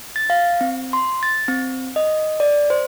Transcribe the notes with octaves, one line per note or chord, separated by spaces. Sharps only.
A6
F5
C4
C6
A6
C4
D#5
D5
C5